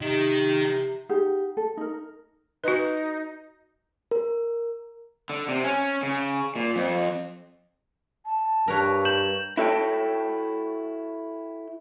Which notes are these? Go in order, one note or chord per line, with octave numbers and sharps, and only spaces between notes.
C3 D#3
D#4 G4 G#4 F#5
A4
D#4 A#4
D#4 F#4 B4
A#4
D3
C3
C#4
C#3
A#2
F2
A5
G2 A#4 B4 C#5
G6 E7 F#7
E4 F#4 A4 C#5 E5 G5